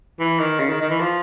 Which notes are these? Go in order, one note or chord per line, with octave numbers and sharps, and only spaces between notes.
E3
D#3
C#3
D#3
D#3
E3
F3